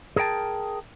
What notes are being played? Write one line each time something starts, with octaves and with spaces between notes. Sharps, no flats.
G#4 A#4 C5 G5 A5